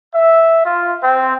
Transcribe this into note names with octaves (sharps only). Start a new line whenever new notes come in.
E5
F4
C4